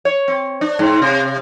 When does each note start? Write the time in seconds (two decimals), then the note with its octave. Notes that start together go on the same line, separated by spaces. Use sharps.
0.05 C#5
0.28 C4
0.61 D4
0.79 G#2
1.02 C3